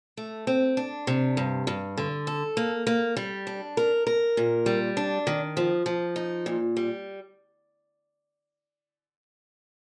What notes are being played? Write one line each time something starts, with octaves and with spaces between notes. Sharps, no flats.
A3
C4
D4
C3
G2
G2
D3
A4
A#3
A#3
G3
D4
A#4
A#4
A#2
G3
D4
D#3
F3
F3
D#4
A#2
G3